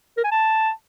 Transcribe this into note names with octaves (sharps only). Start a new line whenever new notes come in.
A#4
G#5
A5